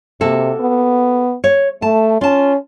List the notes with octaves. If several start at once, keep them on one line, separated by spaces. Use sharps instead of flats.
C3 A#3 F#4 A4
B3
C#5
A3 A5
C#4 F4 A5